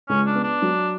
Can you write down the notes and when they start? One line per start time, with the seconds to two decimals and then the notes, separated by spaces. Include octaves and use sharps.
0.09 C#2 C#4
0.27 D4
0.35 B3
0.44 D4
0.62 F#3